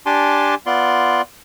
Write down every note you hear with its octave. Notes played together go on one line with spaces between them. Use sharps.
D4 G4 G#5 A5 C6 D6
B3 F4 D5 C6